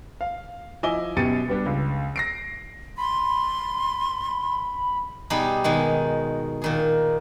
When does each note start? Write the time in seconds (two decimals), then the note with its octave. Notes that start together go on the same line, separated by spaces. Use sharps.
0.21 F5
0.83 F3 E4 D#5 G#5 D6 G7
1.16 F#2 B2 G4 A6 C#7 D#7
1.48 G3 B3 D4 G4
1.66 C#2
2.16 A#6 C7 D7
2.98 B5 C6
5.30 B2 G3 D#4 G4 G#4 B5
5.64 B2 D#3 G#3
6.62 A#2 D#3 G#4